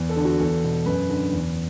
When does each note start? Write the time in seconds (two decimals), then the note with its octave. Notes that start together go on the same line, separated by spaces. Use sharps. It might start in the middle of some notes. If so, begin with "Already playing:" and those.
Already playing: E2
0.09 A4
0.16 D3
0.25 F#4
0.40 E2 A4
0.64 B2
0.86 F#2 B4
1.09 D3
1.32 E2